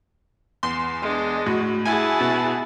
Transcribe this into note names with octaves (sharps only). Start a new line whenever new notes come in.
E2 C6
G#3 D4
A2 F#4
E4 F#4 G#4 G#5 A5
B2